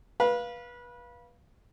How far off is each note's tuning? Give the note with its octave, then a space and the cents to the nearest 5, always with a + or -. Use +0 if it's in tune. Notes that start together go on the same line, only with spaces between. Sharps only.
B4 -25 F5 +0 B5 -25